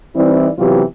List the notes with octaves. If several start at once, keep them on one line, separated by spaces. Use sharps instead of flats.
E3 G3 C4 D#4 E4 D5
C3 E3 F#3 B3 F4 G4